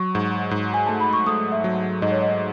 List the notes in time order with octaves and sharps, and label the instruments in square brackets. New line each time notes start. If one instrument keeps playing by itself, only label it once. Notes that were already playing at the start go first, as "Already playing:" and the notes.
Already playing: [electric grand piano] F#3 [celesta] C#6
[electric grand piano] G#2
G#2
[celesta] G#5
[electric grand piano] A3 [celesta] A5
[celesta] B5
C#6
[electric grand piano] A3 [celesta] D#6
[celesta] E5
[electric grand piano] F#3
[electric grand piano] G#2 [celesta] D#5
[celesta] C#5
D#5